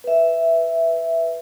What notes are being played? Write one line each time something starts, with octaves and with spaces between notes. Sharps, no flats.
B4 E5